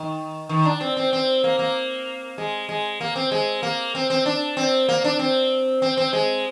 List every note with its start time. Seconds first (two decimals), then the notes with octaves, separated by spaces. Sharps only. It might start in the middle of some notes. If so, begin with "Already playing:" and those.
Already playing: D#3
0.49 D#3
0.65 D4
0.81 C4
0.97 C4
1.13 C4
1.44 A#3
1.59 A#3
2.38 G#3
2.69 G#3
3.01 A#3
3.16 C4
3.32 G#3
3.63 A#3
3.95 C4
4.10 C4
4.26 D4
4.57 C4
4.89 A#3
5.04 D4
5.19 C4
5.82 C4
5.97 C4
6.13 G#3